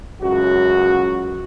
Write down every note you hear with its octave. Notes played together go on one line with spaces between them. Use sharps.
C#2 F#2 F#4